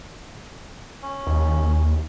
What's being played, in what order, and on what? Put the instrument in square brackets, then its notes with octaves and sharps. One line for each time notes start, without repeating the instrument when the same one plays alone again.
[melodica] C#4
[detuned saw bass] D#2